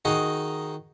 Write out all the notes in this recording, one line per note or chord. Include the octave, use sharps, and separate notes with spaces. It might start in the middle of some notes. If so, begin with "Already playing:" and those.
D#3 D#4 F#4 G#4